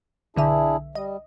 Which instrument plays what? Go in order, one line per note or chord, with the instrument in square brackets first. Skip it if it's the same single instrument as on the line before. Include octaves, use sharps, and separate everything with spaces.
[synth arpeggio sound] B1 D3 E5 [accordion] D4 E4 G#4
[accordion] G3 [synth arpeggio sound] D#5